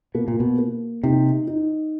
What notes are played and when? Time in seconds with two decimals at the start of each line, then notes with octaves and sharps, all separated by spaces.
0.15 B2 A#3
0.28 A#2
0.40 B2
0.58 A#3
1.04 C3 D#4
1.47 D#4